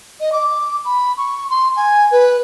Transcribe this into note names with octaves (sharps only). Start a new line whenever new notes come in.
D#5
D6
B5
C#6
C6
G#5
B4